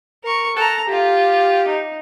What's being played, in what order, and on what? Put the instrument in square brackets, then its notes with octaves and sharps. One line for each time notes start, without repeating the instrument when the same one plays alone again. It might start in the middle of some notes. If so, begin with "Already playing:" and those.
[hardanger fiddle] A#4 C#6
[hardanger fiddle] A4 A#5 [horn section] F#5 G5 A5
[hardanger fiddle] F4 [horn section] G4
[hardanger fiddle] D#4